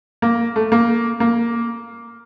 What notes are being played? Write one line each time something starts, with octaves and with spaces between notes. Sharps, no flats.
A#3
A3
A#3
A#3